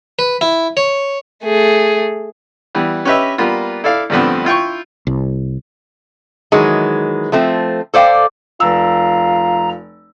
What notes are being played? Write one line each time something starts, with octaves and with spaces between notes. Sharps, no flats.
B4
E4
C#5
A3 G#4
E3 G3 B3
C#4 G4 B4 D#5 E5
G3 A#3 B3 F4
E4 A4 D5 F5
G2 D3 F3 A3 B3 C4
E4 F4 G5 C#6
C2
D#3 E3 F#3 G#3
F3 A3 C4
A4 C5 D5 F5 G5
F1 F4 A#5 E6